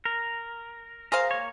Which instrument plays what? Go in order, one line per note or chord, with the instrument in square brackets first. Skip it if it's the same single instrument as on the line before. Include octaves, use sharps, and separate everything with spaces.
[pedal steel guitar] A#4
[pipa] G#4 C5 F5 [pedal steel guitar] A#4
[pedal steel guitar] A#3 C#5